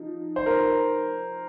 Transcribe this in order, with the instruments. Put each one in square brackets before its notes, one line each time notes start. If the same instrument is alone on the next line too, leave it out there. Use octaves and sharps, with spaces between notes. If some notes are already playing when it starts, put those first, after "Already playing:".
Already playing: [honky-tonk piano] F3 D#4
[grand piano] C5
A#4